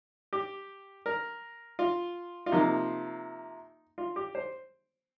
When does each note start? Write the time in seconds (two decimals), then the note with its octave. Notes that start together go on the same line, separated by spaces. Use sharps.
0.33 G4
1.06 A#4
1.79 F4
2.46 F4
2.52 C3 F3 A#3 D#4
3.98 F4
4.16 G4
4.35 C5